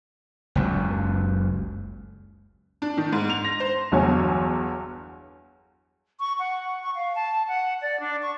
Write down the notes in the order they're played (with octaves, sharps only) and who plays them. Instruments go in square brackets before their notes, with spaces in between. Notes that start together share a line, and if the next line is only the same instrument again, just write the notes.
[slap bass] F#1 C#2 F#2
[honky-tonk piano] D4
D#3
G#2
F7
A#6
C5
G1 E2 F#3 C#5 G#5
[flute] C#6
F#5
C#6
F5
A5
F#5
D5
D4
C#6